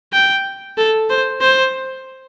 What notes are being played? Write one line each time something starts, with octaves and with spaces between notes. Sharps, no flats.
G5
A4
C5
C5